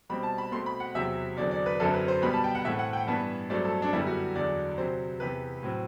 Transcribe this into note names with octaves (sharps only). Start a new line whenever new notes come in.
B2 G3 C4 B5
A5
B5
B2 A3 C4 C6
B5
F#5
E2 C3 F#3 C4 E5
E2 D3 F#3 C4 D5
D5
B4
F#2 D3 F#3 C4 A4
B4
C5
B2 G3 B3 B5
A5
G5
F#5
A2 E3 A3 C4 E5
F#5
G5
G2 E3 B3 A5
G2 F#3 A3 C4 D5
A4
D4
F#2 D3 G3 B3 E4
F#4
E2 D3 F#3 D5
C3 F#3 C4 C5
E2 C3 E3 B4
A2 F#3 C4